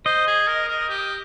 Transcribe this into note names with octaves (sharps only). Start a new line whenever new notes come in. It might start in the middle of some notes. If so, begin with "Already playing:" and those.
C5 D#5
G#4
A#4
A#4
G4